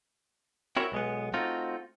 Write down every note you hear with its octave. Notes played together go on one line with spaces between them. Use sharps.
C4 E4 F#4 A#4 C#5
B1 G#3 B3
A3 C4 D#4 F4 F#4